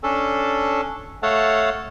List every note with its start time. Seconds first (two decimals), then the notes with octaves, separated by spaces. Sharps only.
0.03 C#4 D4 A4
1.23 A3 A4 C#5 F5 F#5 A5